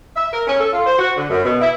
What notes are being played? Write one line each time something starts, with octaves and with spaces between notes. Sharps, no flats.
E5
A#4
C#4
A4
F4
C5
F#4
D3
F#2
B2
E4